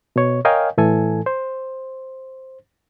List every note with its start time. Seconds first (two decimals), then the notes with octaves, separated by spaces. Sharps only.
0.16 B2 C#5
0.45 A#4 C#5 D#5 F5 G5 G#5
0.78 A2 E3 A4 G#5
1.26 C5